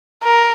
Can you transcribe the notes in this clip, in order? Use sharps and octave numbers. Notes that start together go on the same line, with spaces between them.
A#4